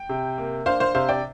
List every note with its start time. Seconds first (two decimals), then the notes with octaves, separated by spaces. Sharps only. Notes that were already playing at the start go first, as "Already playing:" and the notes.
Already playing: G5
0.09 C3
0.38 A#3
0.66 D4 C5 F5
0.80 C5 F5
0.95 C3 C5 F5
1.09 D5 G5